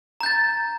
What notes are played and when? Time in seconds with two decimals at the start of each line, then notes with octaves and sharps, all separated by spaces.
0.21 A#5
0.23 G6
0.26 A6